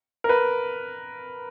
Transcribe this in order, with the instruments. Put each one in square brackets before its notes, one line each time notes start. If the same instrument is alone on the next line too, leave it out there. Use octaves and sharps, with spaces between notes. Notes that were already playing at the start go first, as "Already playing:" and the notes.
[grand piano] A#4
B4